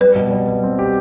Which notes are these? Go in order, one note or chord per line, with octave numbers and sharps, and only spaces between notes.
G3 B4
B2
G3
G3
C4
G4